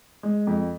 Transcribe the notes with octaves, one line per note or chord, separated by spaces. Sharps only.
G#3
F2